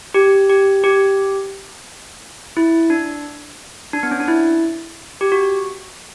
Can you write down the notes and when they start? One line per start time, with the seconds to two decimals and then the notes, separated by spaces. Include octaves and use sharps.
0.14 G4
0.49 G4
0.84 G4
2.57 E4
2.90 D4
3.93 D4
4.03 B3
4.11 C#4
4.20 D4
4.28 E4
5.21 G4
5.32 F#4